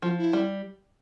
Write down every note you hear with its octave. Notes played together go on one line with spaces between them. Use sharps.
F3 F4
E4
G3